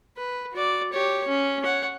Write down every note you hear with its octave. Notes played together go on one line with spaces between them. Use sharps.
B4
F#4 D5
G4 C#5
C#4
C#5 F#5